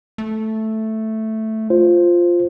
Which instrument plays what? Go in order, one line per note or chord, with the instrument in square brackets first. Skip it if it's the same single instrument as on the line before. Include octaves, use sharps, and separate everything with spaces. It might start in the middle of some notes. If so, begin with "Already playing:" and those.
[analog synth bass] A3
[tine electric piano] F4 C5